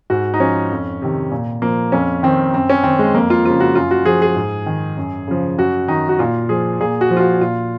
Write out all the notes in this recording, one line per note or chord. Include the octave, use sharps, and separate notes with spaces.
G#2 F#4
D#4
F3 C#4
F2
C3 D#3
A#2
F3 A#3
F2 C#4
D#3 C4
F#2 C4
C#4
D#3 C4
G#3
F2 A#3
F4
C#3 F3 F4
F#4
F#2 F4
F#4
F3 G#4
G#4
G#2
D#3
F#2
C#3 F3
F#2 F#4
D#3 D#4
F#4
A#2 F4
F3 G#4
A#2 G#4
F#4
F3
F4
F#4
A#2 F4